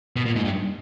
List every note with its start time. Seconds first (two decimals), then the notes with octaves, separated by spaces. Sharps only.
0.16 B2
0.26 A#2
0.36 G#2
0.44 G2